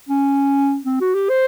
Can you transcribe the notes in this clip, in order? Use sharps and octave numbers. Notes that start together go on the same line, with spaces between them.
C#4
C4
F#4
G4
C5